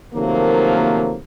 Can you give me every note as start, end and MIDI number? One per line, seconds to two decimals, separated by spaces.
0.14 1.16 48
0.14 1.16 51
0.14 1.16 53
0.14 1.16 54
0.14 1.16 57
0.14 1.16 58